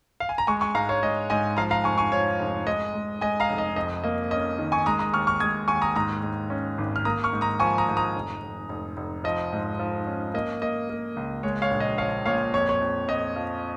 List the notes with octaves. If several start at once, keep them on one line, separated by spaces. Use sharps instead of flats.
F5
G#5
A#5
G#3 G#5 C#6
G#5 C#6
G#2 F5 A#5
C#5 F5
G#3 D#5
G#2 D#5 G#5
F3 F5 A#5
F5 A#5
F1 G#5 C#6
G#5 C#6
F3 C#5
F1
G#3 D#5
G#3
G#3 D#5 G#5
F5 A#5
F1
D#5
F2 D#5
A#3 D#5
C#4 D#5
D#3
G#5 C#6
G#3 A#5 D#6
A#5 D#6
D#2 C#6 F6
C#6 F6
G#3 D#6 G#6
D#2 G#5 C#6
A#5 D#6
G#2 A#5 D#6
G#2
C#4
G#1
F6
A#3 A#5 D#6
C#6 F6
G#2
A#5 D#6
F3 G#5 C#6
A#5 D#6
G#2
A#5 D#6
F1
F1
F1
F1
F3 D#5
G#2
F3
C#4
A#3 D#5
A#3 D#5
A#3
C#2
G#3 C#5
C#5 F5
A#1
D#5
F3 C#5 F5
A#2 C#5 F5
F2 C#5
C#5
F2
F2 D#5
F3